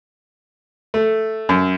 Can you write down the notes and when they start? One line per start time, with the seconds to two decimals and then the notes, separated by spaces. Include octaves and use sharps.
0.94 A3
1.49 F#2